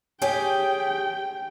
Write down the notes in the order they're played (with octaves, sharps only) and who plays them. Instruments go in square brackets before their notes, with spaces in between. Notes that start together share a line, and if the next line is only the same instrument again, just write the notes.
[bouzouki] G4 G#4 [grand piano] C#5 [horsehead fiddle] G5